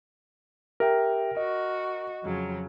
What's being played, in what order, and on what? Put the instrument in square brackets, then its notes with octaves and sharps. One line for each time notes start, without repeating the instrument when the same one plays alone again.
[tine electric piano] G4 E5 G5 [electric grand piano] A#4
[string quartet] F#4 [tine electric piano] D#5
[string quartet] F2 C#3 F#3